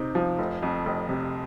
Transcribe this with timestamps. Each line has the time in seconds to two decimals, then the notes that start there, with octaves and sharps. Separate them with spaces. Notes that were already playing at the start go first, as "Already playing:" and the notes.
Already playing: C3 C4 D#4
0.15 F3
0.38 F1
0.62 F2
0.85 F1
1.09 C3